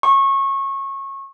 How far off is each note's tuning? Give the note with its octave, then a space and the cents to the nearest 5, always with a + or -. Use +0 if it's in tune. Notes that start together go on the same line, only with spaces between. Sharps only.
C#6 -25